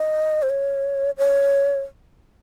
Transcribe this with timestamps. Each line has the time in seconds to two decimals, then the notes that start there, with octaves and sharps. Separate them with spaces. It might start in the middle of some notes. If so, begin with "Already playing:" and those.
Already playing: D#5
0.42 C5
0.50 C#5
1.18 C#5